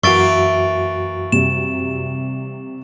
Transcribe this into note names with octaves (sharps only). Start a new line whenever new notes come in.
F#2 E3 A#3 F#4 E5 C#6 A6 D7
C3 G3 E7